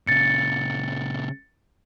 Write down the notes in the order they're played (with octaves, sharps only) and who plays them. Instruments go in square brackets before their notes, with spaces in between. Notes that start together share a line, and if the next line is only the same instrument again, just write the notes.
[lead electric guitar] A#2 C#3 [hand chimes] A6 C#7